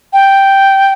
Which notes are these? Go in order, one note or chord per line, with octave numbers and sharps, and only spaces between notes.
G5